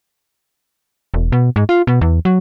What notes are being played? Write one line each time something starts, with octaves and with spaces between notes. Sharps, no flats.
E1
B2
G#2
F4
B2
E2
F#3